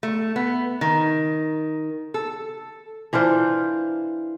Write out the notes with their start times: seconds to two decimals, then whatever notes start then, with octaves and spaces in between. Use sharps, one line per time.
0.03 A3
0.36 B3
0.81 D#3
2.14 A4
3.13 E3 D4 F4 C5